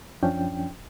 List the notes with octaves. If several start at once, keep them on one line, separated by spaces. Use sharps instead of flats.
F#2 F3 C#4 D4 G5